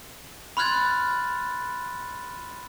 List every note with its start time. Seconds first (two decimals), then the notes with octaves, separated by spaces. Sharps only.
0.57 B5 C6 F6 F#6 G#6 A6